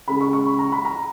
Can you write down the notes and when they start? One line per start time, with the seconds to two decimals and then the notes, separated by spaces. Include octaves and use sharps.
0.08 C#3 G#3 B5
0.21 C#6
0.33 C#6
0.46 B5
0.59 A#5
0.72 B5
0.85 A#5